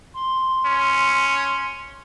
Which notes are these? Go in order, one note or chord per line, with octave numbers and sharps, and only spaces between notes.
C6
C#4